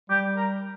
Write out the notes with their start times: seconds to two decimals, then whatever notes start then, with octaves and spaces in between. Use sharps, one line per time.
0.10 G3 G4
0.37 A#4